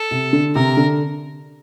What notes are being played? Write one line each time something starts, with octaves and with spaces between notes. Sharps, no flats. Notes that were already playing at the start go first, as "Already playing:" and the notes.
Already playing: A4
C3
D3
C3 A#4
D3